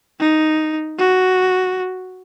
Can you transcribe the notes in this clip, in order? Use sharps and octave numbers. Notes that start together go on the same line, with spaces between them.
D#4
F#4